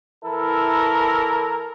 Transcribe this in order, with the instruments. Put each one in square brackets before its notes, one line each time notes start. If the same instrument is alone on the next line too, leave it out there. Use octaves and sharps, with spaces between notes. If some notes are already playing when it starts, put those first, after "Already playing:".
[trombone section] E3 E4 A4 A#4